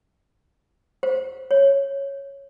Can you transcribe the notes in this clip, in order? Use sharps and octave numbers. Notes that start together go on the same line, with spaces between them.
C5
C#5